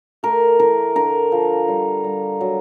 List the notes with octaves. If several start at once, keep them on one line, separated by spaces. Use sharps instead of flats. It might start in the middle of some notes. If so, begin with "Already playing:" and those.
A3 A#4
E3 A#4
D3 A#4
F3
G3
G3
F#3